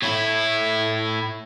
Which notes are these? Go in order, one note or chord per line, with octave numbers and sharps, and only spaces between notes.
A2 E4